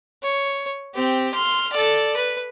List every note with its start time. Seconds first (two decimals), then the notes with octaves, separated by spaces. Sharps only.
0.23 C#5
0.95 C4 G4
1.34 C6 F6
1.73 A4 D5
2.16 B4